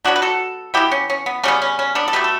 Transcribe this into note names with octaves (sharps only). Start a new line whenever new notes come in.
D3 F#3 B3 D4 F#4
B4
F#4 A4
E3 B3 E4 G4
C#4
C#4
B3
C#3 G3 B3 C#4
C#4
C#4
B3 D4
A4
B2 A3 G4 B4
A4